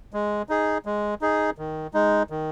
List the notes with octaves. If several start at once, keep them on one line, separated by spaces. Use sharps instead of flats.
G#3
D#4 G#4
G#3
D#4 G#4
D#3
G#3 D#4
D#3